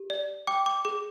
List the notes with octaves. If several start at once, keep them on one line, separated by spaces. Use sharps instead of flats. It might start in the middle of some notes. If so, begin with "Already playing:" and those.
Already playing: G4
D5
G5 D6
D6
G#4 D6